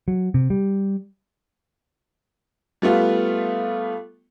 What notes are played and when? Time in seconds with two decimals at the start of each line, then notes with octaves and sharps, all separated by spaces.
0.08 F#3
0.34 C3
0.50 G3
2.82 G3 A3 B3 F4